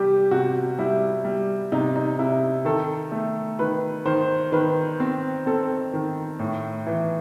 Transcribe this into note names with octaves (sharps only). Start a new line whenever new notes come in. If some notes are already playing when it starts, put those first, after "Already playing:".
Already playing: C3 G3 G4
C3 F#4
G3 E4
G3
C3 D#4
D#4
C3 E4
D#3 A4
A3
D#3 B4
D#3 C5
D#3 B4
C4
C4 A4
D#3
A2
E3